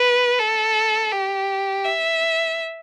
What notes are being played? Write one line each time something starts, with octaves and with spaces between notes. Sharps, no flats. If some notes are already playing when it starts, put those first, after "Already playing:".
Already playing: B4
A4
G4
E5